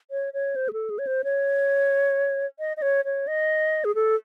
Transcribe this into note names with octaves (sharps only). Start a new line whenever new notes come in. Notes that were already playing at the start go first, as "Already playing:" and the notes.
C#5
C#5
C5
G#4
A4
G#4
C#5
C5
C#5
D#5
D#5
C#5
C#5
D#5
G#4
A4